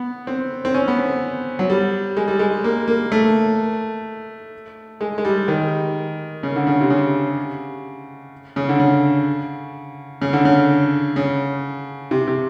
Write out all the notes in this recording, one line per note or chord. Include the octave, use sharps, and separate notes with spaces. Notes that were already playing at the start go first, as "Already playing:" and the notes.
Already playing: B3
C4
C4
C#4
B3
C4
F#3
G3
G#3
G3
G#3
A#3
A#3
A3
G#3
G#3
G3
D#3
C#3
D3
C#3
C3
C#3
C#3
D3
C#3
C#3
D3
C#3
C#3
C3
C3